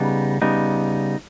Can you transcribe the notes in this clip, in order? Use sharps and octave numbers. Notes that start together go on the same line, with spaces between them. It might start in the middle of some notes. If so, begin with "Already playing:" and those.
Already playing: C#3 G3 B3 D#4
C#3 G3 B3 D#4